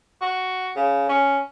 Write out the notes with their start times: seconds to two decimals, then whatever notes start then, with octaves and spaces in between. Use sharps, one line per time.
0.21 F#4
0.76 C#3
1.09 C#4